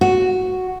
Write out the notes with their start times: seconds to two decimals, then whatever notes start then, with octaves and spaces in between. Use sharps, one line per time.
0.01 F#4